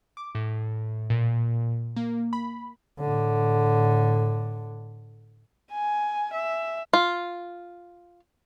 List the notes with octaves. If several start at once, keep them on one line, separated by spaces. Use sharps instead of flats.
D6
A2
A#2
A#3
B5
A2 D3
G#5
E5
F4